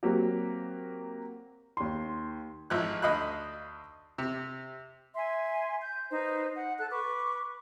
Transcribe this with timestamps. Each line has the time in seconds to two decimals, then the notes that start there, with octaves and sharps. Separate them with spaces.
0.03 F#3 A#3 C4 F#4 G4
1.77 D#2 C6
2.70 G#1 F3 E4 F#6
3.02 D2 D#5 F5 B5 F#6
4.18 C3
5.15 E5 G#5 C6
5.81 G6
6.11 D#4 B4 C5
6.55 F#5
6.79 A4 A5 F#6
6.91 B4 B5 C#6 D6